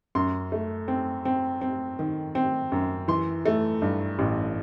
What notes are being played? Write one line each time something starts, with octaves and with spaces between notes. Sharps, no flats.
F#2 C6
A3
C4
C4
C4
D#3
C4
F#2
E3 C6
A3
G2
A1